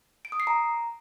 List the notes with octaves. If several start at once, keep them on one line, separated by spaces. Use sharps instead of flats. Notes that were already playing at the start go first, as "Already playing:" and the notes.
D7
D#6
C7
A#5